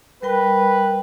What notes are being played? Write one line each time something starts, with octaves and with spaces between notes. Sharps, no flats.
G3 A#4 B4 G5